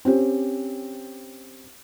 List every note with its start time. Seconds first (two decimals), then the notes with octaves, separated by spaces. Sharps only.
0.05 C4 C#4 G4